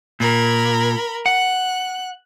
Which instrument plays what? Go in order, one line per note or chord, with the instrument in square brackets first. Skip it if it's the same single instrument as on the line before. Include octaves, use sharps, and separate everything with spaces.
[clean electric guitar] A#2 [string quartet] A#4 B5
[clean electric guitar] F#5 [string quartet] F#6